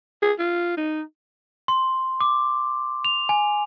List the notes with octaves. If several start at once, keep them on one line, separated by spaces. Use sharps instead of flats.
G#4
F4
D#4
C6
D6
F7
G#5